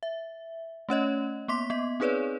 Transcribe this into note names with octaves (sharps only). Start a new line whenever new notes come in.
E5
A3 C#4 C#5 D#5
A#3 B3 C6 D6 B6
B3 D#5
C4 D#4 G#4 B4 C#5 D5